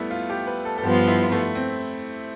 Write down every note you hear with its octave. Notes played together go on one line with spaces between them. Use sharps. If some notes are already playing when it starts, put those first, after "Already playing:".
Already playing: G3 A3 B3 E4
F4
G4
B4
A4
A4
G2 F3 B3 F4 G4
E4
A3
C4